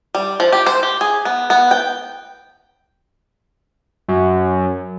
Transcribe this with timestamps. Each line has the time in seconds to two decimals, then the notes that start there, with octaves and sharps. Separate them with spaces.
0.15 G3
0.40 F3
0.52 G4
0.66 C5
0.83 G4
1.01 G#4
1.25 B3
1.50 B3
1.71 G5
4.08 F#2